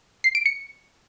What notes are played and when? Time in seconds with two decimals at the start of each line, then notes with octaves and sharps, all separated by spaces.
0.24 C7
0.35 D7
0.46 C#7